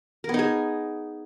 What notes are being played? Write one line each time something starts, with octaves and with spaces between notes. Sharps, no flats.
B3 D#4 G#4 A#4